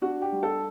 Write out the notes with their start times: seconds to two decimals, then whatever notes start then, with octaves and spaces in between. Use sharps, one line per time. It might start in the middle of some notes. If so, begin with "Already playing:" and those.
0.01 D4 F#4
0.22 G4
0.32 G3
0.43 A4